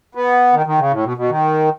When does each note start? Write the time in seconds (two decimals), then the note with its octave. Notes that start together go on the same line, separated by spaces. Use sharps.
0.15 B3
0.53 D#3
0.66 D#3
0.79 C#3
0.91 A2
1.04 B2
1.17 B2
1.29 D#3